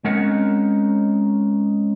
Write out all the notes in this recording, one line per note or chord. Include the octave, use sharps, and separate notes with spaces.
G#3 C4 C#4 D#4 A#4 F#5